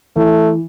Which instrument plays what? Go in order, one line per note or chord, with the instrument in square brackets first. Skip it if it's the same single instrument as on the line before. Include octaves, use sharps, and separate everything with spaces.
[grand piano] E3 [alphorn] A3